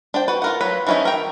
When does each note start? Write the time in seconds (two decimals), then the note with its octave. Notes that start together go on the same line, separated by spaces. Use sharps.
0.14 D4 C5 G5
0.28 F#4 B4
0.42 F4 A#4 F#5
0.61 F#3 B4
0.87 E3 F3 C#4 D#4 E4
1.05 A#4 G5